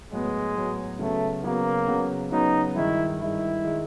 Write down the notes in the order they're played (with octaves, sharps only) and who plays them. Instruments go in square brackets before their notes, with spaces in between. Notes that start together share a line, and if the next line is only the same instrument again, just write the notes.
[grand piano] A2 F#3 B3 [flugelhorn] G#3
[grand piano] A2 F#3 B3
[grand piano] C#3 F#3 B3 [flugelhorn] A3
[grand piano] C#3 F#3 B3 [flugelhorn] A#3
[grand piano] C#3 F#3 B3
[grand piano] C#3 F#3 B3 [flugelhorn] D#4
[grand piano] G2 D#3 G#3 [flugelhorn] E4
[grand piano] G2 D#3 G#3 [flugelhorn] E4
[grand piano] D#3 G#3